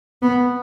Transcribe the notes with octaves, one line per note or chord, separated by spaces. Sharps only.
B3